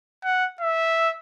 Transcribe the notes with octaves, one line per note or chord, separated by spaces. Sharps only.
F#5
E5